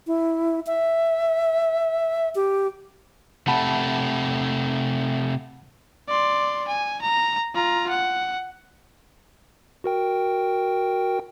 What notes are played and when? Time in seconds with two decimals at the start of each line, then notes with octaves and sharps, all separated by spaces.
0.07 E4
0.67 E5
2.35 G4
3.47 C3 A3 F#5 A5 B5
6.08 D5 C6
6.68 G#5
7.02 A#5
7.55 F4 A#5
7.90 F#5
9.84 F#4 A#4 G5